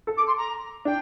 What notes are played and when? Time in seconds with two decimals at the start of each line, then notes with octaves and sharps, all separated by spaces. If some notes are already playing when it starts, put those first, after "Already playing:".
0.07 A4
0.17 D6
0.27 C6
0.37 A#5
0.85 D4 G5